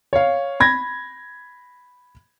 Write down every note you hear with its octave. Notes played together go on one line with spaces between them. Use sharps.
C#5 F5
B5 G#6 A#6